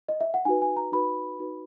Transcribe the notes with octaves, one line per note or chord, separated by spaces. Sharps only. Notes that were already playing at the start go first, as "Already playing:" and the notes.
D#5
E5
F#5
D#4 F#4 B4 G#5
G#5
A#5
D#4 F#4 B4 B5
D#4 F#4 B4